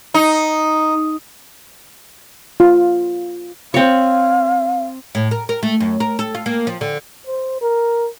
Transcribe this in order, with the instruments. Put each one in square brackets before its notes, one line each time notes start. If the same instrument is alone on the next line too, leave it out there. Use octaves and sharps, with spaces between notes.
[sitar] D#4
[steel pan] F4
[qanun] C4 C#5 [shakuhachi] F5
[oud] A2
A#4
A#4
A3
F#2
A#4
A4
F4
A#3
F3
D3
[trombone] C5
A#4